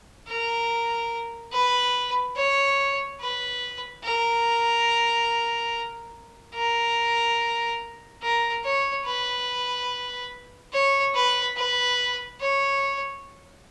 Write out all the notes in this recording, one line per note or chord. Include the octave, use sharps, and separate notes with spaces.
A#4
B4
C#5
B4
A#4
A#4
A#4
C#5
B4
C#5
B4
B4
C#5